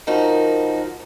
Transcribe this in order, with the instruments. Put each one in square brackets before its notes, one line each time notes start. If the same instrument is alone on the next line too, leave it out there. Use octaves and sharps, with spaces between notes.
[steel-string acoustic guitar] F3 D#4 F#4 [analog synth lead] A#4